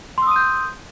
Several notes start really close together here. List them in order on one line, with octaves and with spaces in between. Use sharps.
C6 E6 D#6 D#7 G6